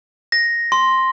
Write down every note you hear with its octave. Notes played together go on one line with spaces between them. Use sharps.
A#6
C6